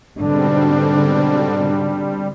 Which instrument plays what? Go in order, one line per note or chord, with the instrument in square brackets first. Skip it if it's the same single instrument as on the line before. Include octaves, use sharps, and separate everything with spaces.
[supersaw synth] G#2 B2 C4 [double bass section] D3 [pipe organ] G3 [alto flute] D4